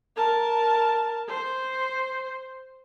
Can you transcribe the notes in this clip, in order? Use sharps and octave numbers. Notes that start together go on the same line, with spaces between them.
A#4 A5
C5